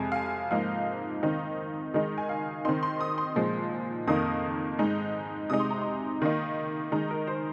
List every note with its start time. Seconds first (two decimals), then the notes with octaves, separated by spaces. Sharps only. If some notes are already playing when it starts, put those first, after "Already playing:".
Already playing: F2 C3 G#3 G#5
0.12 F5
0.16 G#5
0.51 G#2 F3 A#3 D#4 F5
1.22 D#3 C4 D#4
1.94 D#3 G#3 D#4 D#5
2.18 G#5
2.29 F5
2.65 D#3 C4 D#4 C6
2.83 C6
3.01 D#6
3.18 C6
3.36 A#2 F3 G#3 D#4
4.07 F2 D#3 A#3 D#4 D#6
4.79 G#2 G#3 D#4
5.50 C3 G#3 D#4 D#6
5.60 C6
5.71 A#5
5.81 C6
6.22 D#3 A#3 D#4
6.92 D#3 G#3 D#4 A#5
7.11 A#4
7.27 C5